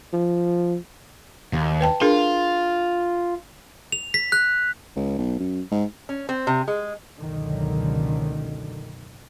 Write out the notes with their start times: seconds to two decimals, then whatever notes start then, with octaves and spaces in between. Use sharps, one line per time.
0.13 F3
1.53 D#2
1.81 B4 G5 A5
2.01 D4 F4 G#4 A#4
3.92 F7
4.14 B6
4.32 F#6
4.96 C#2
5.19 B1
5.39 F#2
5.71 G#2
6.09 C#4
6.29 C4
6.47 C3
6.68 G#3
7.18 F#1 C#2 F#2 B2 D3 D#3